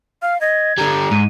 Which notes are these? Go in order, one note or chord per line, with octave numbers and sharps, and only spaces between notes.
F5 F6
D#5 G#6
D3 G3 A#5
G#2 D#7